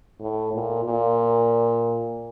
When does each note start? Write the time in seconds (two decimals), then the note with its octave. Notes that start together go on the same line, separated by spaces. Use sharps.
0.21 A2
0.53 A#2
0.85 A#2